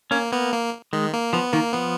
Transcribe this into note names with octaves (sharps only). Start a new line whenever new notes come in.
A#3 C#4
A#3 B3
A#3
D#3 G#3
A#3
F3 B3
D#3 A#3
F3 B3